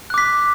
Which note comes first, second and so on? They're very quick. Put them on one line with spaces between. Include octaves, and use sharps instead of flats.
F#6 D6 B6